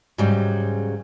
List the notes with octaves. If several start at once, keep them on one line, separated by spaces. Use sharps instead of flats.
G#2 C#3 F#3 G3